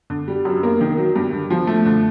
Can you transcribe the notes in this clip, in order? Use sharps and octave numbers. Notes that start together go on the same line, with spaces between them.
D3
G3
F#2
A#3
D#3
F#3
G2
D3
F3
A3
D3